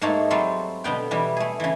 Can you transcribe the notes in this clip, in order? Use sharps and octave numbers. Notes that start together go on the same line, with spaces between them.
G#2 A3 A#3 D#4 C#5 A5
F#3 G3 C4 F4 A4 C6
B2 D3 B3 G5
B2 E3 G3
A3 G#4
C#3 E3